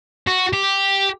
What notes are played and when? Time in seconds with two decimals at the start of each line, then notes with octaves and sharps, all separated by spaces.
0.27 F#4
0.53 G4